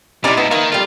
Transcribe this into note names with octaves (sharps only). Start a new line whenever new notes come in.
C3 C#4 D#4 E4 G4 D5
G#2 B2 B3
D#3 A#3 A#4
G3 A3 F4